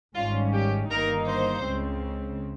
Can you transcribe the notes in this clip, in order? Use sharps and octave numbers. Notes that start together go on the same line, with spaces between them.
G#1 G#2 G3 C#4 F4
G4
G1 G2 D#3 A#3 D#4 A#4
C5
C#2 C#3 G#3 C4